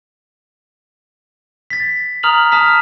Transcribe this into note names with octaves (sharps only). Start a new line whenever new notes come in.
A6 B6
A#5 D#6 F6 F7 F#7
A5 D#6 F6 B6